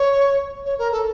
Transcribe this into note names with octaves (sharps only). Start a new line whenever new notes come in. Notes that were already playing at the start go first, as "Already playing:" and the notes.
Already playing: C#5
C#5
A#4
A4